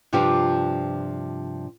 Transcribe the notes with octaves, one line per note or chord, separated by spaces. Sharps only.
G2 C3 F3 D4 F4 G4